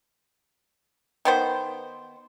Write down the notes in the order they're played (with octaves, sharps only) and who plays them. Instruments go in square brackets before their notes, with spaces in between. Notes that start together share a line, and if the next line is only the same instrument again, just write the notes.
[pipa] D#3 B3 C5